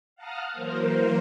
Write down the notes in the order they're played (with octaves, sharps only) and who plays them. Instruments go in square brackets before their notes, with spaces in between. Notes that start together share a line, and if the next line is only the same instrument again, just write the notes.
[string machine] F5 F#5 A5 A#5 D#6 F6
E3 F#3 A#3 A#4 C5